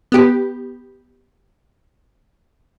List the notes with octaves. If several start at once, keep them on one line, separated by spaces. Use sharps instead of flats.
B3 G4